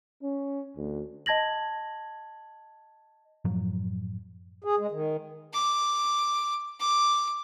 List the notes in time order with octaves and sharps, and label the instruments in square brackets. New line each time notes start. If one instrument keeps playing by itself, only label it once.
[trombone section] C#4
D2
[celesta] D#5 A5 G#6 A#6 F#7
[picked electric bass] F#2 A2 F3 F#3
[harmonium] G#4
G#3
D#3
[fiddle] D6
D6